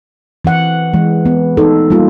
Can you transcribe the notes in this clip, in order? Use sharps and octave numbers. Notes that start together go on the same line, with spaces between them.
E3 C4 F#5
E3 G#3
B3
D#4 A4
G3 A#3 F4